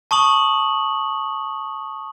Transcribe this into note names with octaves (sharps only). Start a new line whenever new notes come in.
A5 C#6 D#6 F#7